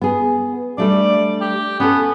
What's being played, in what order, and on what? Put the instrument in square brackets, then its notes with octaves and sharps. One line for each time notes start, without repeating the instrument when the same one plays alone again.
[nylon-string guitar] B3 G#4
[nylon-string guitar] G3 A3 D4 [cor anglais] D5
[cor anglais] G4
[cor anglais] B3 [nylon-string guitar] C#4 A4